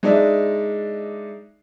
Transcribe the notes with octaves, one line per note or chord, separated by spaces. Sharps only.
G#3 D4 D#4 D5 E5